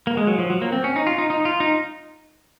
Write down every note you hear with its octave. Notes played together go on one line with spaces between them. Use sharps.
A#3
G#3
F#3
F3
F#3
A#3
C4
C#4
D#4
F4
D#4
D#4
F4
D#4